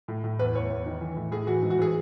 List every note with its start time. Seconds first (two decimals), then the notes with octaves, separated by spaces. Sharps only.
0.08 A2
0.24 A2
0.39 E2 B4
0.55 E2 C#5
0.70 E2
0.86 D#3
1.01 E3
1.16 A2
1.31 A2 G#4
1.47 E3 F#4
1.62 G#2
1.70 F#4
1.78 E3 G#4